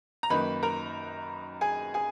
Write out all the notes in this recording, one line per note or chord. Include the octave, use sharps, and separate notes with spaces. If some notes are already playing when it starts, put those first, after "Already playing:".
A#5
F#2 D#3 A#3 D#4 B4 B5
A#4 A#5
G#4 G#5
G#4 G#5